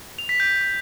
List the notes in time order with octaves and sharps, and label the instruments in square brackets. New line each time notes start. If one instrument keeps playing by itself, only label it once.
[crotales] F7
B6
G6